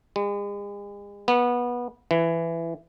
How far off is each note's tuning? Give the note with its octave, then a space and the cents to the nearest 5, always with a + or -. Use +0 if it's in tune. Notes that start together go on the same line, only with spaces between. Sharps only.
G#3 -40
B3 -20
E3 +15